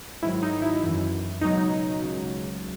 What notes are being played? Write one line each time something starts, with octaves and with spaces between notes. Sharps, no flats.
G#2 D#3 F#3 E4
D#4
E4
F#2 E3
C#2 B2 F#3 D#4
C#2 C#3 F#3